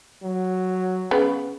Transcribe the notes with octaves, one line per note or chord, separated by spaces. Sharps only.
F#3
C#3 B3